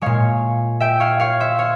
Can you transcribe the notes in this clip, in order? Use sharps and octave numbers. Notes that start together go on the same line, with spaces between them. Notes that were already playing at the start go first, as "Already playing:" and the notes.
A#2 G#3 C#5 F5
E5 G5
C#5 F5
C#5 F5
C5 E5
C#5 F5